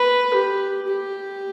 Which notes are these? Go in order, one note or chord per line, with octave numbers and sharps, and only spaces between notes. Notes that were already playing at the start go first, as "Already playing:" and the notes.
Already playing: B4
G4
G4